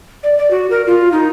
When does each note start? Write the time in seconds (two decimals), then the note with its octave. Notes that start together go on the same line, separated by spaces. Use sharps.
0.23 D5
0.38 D5
0.51 F#4
0.70 A#4
0.87 F4
1.12 D#4